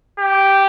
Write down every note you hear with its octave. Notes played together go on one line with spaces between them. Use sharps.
G4